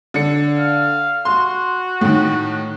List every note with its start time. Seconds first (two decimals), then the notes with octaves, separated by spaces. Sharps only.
0.14 D3 C#7
0.59 F5
1.25 F#4 C6
2.01 A2 D#3